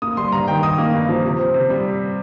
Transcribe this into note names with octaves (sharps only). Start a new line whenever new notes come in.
A#3 D#6
G3 C6
G2 A#5
D#3 G5
D#4 D#6
A#3
G2
F3
C3
C4
C3
G3